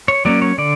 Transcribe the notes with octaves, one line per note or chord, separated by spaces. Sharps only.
C#5
F#3 A#3 C#4 D5
C#5
D3 D5